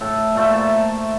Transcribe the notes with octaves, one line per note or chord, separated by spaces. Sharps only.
A2 A4
A#2 A3 C5
A5